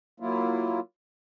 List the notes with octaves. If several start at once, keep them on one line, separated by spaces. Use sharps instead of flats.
F#3 A#3 E4 F4